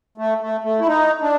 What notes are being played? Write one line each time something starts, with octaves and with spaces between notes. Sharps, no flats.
A3
A3
A3
E4
D#4
D4